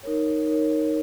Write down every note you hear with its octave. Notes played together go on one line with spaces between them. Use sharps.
D#4 A#4 C#5
D#4 A#4 C#5